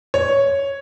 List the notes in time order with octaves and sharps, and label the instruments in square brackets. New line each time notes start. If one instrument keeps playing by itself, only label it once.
[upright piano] C#5